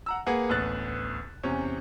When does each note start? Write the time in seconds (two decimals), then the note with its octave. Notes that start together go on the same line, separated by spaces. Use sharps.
0.06 F#5 A#5 E6
0.26 A#3 G#4 B4 F#5
0.49 A1 D2 B3 F#6 A6
1.43 E2 C3 C#4